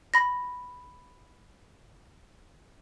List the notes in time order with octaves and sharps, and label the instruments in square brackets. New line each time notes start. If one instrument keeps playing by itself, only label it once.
[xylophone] B5 A#6